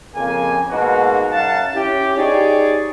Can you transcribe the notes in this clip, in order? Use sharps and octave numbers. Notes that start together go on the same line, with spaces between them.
F2 C#3 A#3 G#5
G#2 B2 G#3 A#3 F#4
F#2 F5 F#5 A5
C#4 E4 G4
D#4 G4 G#4 C#5 D5